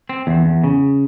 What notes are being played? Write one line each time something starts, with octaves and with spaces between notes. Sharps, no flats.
C4
E2
E2
C#3